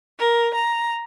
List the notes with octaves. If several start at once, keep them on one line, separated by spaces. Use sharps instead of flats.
A#4
A#5